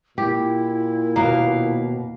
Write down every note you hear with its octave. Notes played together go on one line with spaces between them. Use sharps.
A#2 E4 G4
D#2 B2 A#3 F5